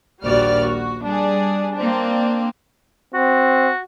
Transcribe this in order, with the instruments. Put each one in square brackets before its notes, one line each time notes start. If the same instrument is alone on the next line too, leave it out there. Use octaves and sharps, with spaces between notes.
[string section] A#1 D#2 G3 F#4 D5 F6
F#4
G3 D4 G#4
A#3 C4 D4
[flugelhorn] C4 [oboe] F#4